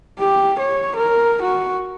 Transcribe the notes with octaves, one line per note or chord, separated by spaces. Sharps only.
G4
C#5
A#4
F#4